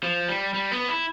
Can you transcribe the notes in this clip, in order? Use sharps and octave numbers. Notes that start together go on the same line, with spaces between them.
F3
G3
G3
B3
E4